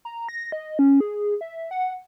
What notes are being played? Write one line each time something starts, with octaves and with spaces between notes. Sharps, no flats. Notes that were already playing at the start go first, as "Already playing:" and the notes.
A#5
A#6
D#5
C#4
G#4
E5
F#5